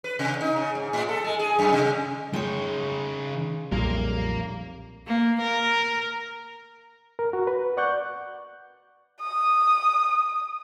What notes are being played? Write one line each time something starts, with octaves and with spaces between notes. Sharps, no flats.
B4
C3
D#4
C#3
G#2
A2
A4
G#3
G#4
F#2
C3
C#3 G#3 D#4 C#5 G5
B1 F2 A#2 G3 A#3 A#4
A#3
A#4
A#4
F#4
B4
D5 F#5 C#6 F#6 G6
D#6